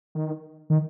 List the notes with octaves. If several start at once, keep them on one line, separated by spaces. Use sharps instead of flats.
D#3
D#3